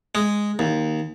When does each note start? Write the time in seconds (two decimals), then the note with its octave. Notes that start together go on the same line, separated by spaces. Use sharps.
0.15 G#3
0.59 D#2